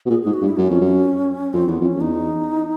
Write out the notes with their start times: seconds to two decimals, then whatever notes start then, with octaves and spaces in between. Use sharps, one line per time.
0.05 B2
0.10 A#2 G#4
0.22 G#2 G#4
0.34 F#4
0.42 G2
0.46 E4
0.57 F#2 C#4
0.70 F2
0.81 F#2
1.53 F2 C4
1.67 E2 B3
1.81 F2
1.85 C#4
1.96 F2
2.01 E2 D#4